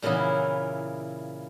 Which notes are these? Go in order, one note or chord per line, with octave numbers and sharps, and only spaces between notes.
A#2 C#3 E3 B3 E4